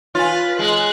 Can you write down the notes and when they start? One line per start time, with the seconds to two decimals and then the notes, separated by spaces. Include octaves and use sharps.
0.15 F4 B4 C#5 G#5
0.59 G#3 F#6